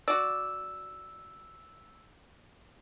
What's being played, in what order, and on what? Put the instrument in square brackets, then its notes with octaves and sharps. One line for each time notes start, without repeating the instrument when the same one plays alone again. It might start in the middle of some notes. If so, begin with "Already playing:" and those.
[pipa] F#4 D5 [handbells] E6